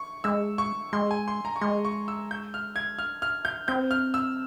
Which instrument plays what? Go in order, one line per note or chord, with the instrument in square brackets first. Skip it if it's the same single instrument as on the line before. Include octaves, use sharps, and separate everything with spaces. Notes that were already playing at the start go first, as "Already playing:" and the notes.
Already playing: [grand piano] C#6
[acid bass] G#3 [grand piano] E6
[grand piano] C#6
[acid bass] G#3 [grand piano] C6
[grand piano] G#5
C6
A#5
C#6
[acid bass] G#3 [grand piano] C6
[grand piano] C#6
E6
G6
F6
G#6
F6
F6
G6
[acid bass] C4 [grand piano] G6
[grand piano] F6
E6